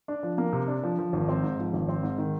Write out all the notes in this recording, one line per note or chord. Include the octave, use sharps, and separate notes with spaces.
D4
F3
A#3
C3
D4
F3
F3
G#1
C4
G#2
F3
G#1
C4
G#2
D#3